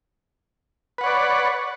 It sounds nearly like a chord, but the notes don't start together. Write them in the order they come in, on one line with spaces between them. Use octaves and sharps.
B4 F#5 C#5 D5